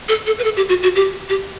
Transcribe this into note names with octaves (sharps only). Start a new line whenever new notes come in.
A4
A4
B4
A4
G4
F#4
F#4
G4
G4